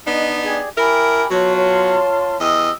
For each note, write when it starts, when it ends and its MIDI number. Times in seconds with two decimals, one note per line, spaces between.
0.07 0.59 59
0.07 0.59 62
0.07 0.59 63
0.07 0.37 75
0.44 0.69 67
0.44 0.69 68
0.44 0.69 74
0.77 1.23 64
0.77 1.30 67
0.77 1.23 70
0.77 1.30 80
0.77 1.30 83
1.31 1.97 47
1.31 1.97 54
1.31 2.39 65
1.31 1.54 73
1.31 2.39 81
1.31 2.39 84
1.56 2.38 73
2.40 2.71 40
2.40 2.73 67
2.40 2.71 75
2.40 2.73 88